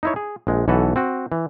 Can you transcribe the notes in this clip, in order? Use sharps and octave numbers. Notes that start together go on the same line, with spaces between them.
D#4 E4 C#5
G#4
A#1 G#3
B1 E3 F#4 A4 B4
C4 F#4
E3